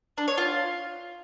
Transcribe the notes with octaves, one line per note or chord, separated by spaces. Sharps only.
D4
C#5
F4